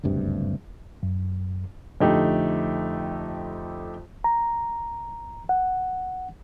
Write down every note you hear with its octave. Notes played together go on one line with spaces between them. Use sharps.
F#1 D2 G2 C3
F#2
F2 D3 A3 D#4 G4
A#5
F#5